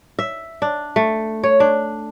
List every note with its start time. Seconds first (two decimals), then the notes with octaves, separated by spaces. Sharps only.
0.19 E5
0.62 D4
0.96 A3
1.43 C#5
1.60 D4